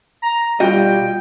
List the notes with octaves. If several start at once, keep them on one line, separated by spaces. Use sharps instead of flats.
A#5
B2 G3 F4 F#4 D#5 G5